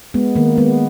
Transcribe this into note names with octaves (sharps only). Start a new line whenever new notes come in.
G#3 B3
D#3 A#3
G#3 B3